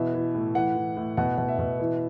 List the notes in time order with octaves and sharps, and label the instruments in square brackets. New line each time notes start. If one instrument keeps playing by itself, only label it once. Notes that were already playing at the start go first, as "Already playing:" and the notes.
Already playing: [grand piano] B2 E3 E5
E3
A2
E3 F#5
E3
A2
B2 F#5
B2
E5
B2
E3